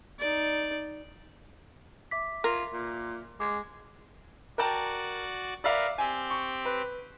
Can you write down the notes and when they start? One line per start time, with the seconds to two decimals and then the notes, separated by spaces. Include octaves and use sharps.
0.19 D#4 D5
2.11 E5 D6 B6
2.44 F4 A#4
2.73 A#2
3.40 G#3 D6
4.58 F#4 A#4 D5 G5 A5
5.64 A#4 B4 D5 E5 F5
5.98 C4 G4 G#5
6.30 C#6
6.65 B4